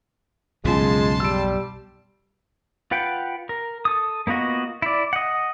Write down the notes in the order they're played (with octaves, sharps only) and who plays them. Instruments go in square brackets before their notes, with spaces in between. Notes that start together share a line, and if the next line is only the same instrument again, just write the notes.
[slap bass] B1 F2 G#2 [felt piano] C#3 F3 [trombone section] G#3 [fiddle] A5 C6
[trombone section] G3 [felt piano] E6 D7
[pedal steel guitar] F4 B4 F#5 G5
A#4
A4 D#6
A#3 B3 F4 F#4 D#5
E4 D5
D#5 F#5